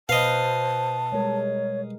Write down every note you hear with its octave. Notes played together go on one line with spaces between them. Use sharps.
B2 B4 C5 D#5 F5 A5
G3 G#3 A#4 C#5